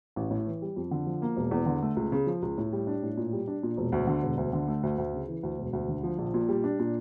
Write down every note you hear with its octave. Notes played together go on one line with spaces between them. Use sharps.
A1
A2
E3
G3
F2
D3
F3
A#3
E1
E2
D3
A3
C#2
C#3
F3
C#2
A2
G3
D4
A2
A#2
G3
D4
A#2
E1
D2
D3
E1
D2
D3
A3
D2
D2
C#3
E3
D2
E1
D2
D3
F3
A#1
A#2
G3
D4
A#2